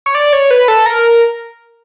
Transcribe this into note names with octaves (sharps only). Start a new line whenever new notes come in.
C#5
D5
C#5
B4
A4
A#4